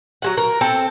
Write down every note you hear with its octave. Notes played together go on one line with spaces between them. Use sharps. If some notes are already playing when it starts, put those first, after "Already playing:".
F#3 G#3 F#5
A#4
C4 A4